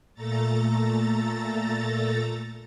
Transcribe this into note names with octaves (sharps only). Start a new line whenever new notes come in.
A#2 A3 A4 A#5 A6